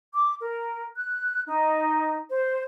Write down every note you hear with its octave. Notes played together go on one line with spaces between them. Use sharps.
D6
A#4
F#6
D#4
C5